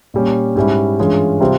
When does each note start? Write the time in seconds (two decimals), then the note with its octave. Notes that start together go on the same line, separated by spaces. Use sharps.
0.14 A#2 G3 C#4
0.56 G#2 G3 C#4 E4
0.99 G2 E3 G#3 C#4 F4
1.40 C3 G3 C4 F4